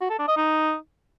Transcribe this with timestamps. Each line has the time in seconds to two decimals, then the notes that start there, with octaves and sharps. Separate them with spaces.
0.01 F#4
0.10 A4
0.19 D4
0.28 D#5
0.37 D#4